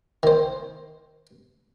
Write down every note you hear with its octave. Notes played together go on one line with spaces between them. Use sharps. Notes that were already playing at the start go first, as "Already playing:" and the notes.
D#3 C5